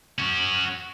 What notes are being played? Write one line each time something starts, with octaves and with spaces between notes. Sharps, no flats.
C#4 F#4